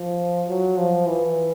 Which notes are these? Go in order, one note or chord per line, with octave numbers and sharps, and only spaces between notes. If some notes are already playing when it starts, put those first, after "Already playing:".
Already playing: F3
F#3
F3
E3